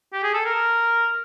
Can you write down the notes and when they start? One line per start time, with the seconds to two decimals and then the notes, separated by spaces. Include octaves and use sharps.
0.13 G4
0.24 G#4
0.34 A4
0.45 A#4